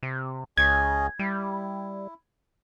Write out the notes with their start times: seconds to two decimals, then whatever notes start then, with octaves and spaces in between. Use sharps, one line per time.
0.03 C3
0.58 C#2 C#4 G#4 D#5 G#6
1.19 G3 E4